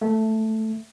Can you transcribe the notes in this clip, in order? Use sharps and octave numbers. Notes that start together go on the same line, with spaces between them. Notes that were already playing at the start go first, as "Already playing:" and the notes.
A3